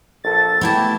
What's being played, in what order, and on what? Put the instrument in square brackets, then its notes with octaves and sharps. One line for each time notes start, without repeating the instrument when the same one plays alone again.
[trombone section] A#1 A4 [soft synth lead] A6
[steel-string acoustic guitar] A3 E4 A5 [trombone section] B3 G4